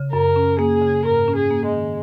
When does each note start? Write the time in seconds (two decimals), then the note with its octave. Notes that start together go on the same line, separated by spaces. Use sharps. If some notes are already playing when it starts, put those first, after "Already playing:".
Already playing: C#3
0.13 F#2 A#4
0.36 C#4
0.59 A#3 G#4
0.82 C#3
1.05 G#2 A#4
1.28 C#4
1.35 G#4
1.51 A#3
1.66 G#3
1.73 D#3